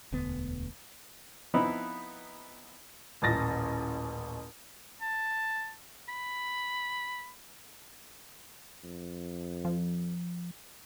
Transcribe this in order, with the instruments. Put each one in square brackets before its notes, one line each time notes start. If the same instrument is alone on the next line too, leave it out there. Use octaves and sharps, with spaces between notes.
[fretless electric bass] E1 D2 D3 B3
[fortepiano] F3 B3 C4 D#4 E4
[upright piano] D#1 A1 A6 A#6
[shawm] A5
B5
[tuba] F2
[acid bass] F3